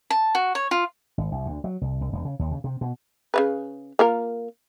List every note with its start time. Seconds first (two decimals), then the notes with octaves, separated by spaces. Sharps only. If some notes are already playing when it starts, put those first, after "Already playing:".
0.10 A5
0.35 F#4
0.55 C#5
0.71 F4
1.18 G#1
1.32 C2
1.46 D2
1.64 F#3
1.81 C2
2.01 C2
2.12 E1
2.25 C#3
2.39 D#2
2.52 C#3
2.64 C3
2.81 B2
3.34 C#3 A3 B4
3.99 A#3 F4 A#4